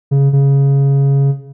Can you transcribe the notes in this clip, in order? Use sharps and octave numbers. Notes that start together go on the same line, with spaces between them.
C#3
C#3